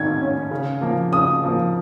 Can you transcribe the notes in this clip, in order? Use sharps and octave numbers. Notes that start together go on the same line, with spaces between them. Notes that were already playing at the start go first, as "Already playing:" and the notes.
Already playing: D#3 G#6
C#4
C#3
F3 A#3
C#3 D#6
F3 A#3